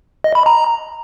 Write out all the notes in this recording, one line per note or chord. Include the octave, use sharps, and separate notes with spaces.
D#5
B5
A#5